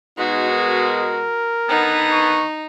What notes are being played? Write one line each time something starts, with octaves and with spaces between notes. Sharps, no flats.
B2 G#3 D#4 F#4
A#4
D3 D#3 B3 D#4
C#6